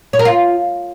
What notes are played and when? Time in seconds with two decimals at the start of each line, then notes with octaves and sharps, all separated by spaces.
0.13 C#5
0.19 A#4
0.25 F4